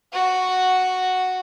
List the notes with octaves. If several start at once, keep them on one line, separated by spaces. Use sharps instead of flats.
F#4